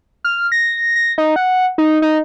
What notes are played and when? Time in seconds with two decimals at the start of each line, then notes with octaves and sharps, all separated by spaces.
0.24 F6
0.52 A#6
0.96 A#6
1.18 D#4
1.36 F#5
1.78 D#4
2.02 D#4